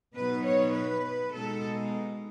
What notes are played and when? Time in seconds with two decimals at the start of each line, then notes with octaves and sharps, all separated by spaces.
0.16 B2 F#3 B3 D#4 B4
0.46 C#5
0.75 B4
1.33 B2 G#3 D#4 A4